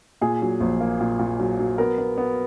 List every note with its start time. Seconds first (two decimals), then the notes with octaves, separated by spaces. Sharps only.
0.21 A#2 G#4
0.42 F#3
0.60 A#1
0.80 A#3
1.01 A#2
1.19 A#2
1.40 F#3
1.59 F#3
1.78 B3 A#4
1.98 B3
2.17 B3